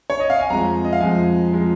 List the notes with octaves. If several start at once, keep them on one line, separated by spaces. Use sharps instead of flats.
C#5
D#5
F5
G#5
F2 F3 G#3 A#5
D#5
F5
F2 F3 G#3 G#5
F3 G#3